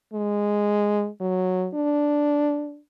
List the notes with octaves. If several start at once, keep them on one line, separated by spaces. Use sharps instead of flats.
G#3
F#3
D4